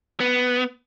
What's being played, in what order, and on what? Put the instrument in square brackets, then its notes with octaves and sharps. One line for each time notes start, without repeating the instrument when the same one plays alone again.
[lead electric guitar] B3